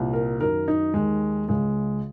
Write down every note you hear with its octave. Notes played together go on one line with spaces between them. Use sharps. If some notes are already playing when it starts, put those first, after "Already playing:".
Already playing: C2 A#2
A#4
F#2 D#3 A#4
D#4
D#2 D#3 G#3
C#2 C#3 G#3